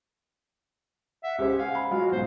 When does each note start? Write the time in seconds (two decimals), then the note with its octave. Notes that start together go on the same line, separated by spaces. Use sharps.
1.23 E5 F#5
1.38 C#2 G4 G#4 C5
1.59 F5 G#5
1.75 B5
1.91 F#3 G#3 F4 F#4 F5
2.12 B1 G#2 C5